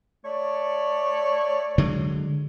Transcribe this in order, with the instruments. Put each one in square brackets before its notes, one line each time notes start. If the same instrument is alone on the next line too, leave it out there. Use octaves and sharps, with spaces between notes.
[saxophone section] A3 C#5 D5
[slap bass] D3 F#3 G#3